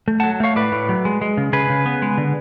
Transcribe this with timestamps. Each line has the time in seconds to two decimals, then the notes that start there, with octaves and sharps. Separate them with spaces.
0.08 A3
0.20 F#3 F#5 A5
0.40 A3 C#5 F5
0.56 A2 B4 D5
0.72 A2
0.89 F#3
1.05 G#3
1.22 G#3
1.37 C#3
1.53 C#3 G#4 B4
1.70 C#3
1.86 B3
2.02 G#3
2.18 D3